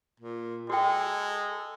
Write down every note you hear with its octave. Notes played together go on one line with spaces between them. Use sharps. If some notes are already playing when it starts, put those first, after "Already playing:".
A#2
G#3 F#4 A4 G5